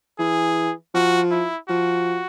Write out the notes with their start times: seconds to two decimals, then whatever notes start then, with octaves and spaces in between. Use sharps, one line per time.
0.19 E3 G#4
0.94 F3 F#4
1.31 E4
1.69 F3 F#4